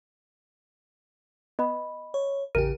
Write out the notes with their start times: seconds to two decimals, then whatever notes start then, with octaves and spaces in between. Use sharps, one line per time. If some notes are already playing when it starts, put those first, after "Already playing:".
1.59 B3 D#5 B5
2.14 C#5
2.55 A1 E2 C#3 G4 A#4 D#7